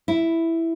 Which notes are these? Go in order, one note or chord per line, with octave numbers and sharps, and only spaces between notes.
E4